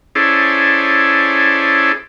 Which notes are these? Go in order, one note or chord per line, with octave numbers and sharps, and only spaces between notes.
C#4 E4 G#4 A4 C5 D5